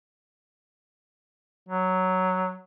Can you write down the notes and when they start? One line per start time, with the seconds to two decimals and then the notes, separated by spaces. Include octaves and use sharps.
1.69 F#3